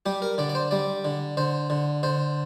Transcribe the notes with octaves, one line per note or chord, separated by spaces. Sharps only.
G3 G4
A#4
D3 D5
D5
C5
G3 D5
D3
D3 C5
D3
D3 C5